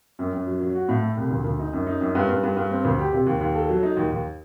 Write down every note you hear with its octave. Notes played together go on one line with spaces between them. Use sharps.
F#2
F#2
F#3
F#3
F#4
A2
A3
C2
D2
D2
D#4
F#2
D#4
F#2
G2
G2
G2
G2
C4
D2
G4
C3
D#2
D#2
A4
F#3
D#4
D#2
D#2